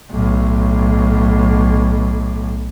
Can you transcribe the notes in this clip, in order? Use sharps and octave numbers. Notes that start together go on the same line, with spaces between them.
B1 A2